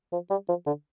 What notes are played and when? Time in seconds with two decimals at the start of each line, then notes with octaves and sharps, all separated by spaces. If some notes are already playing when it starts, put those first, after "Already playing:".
0.13 F3
0.30 G3
0.48 F3
0.66 D3